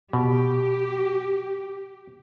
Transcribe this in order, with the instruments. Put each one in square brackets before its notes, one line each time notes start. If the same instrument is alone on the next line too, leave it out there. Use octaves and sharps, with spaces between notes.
[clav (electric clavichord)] B2 [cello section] G4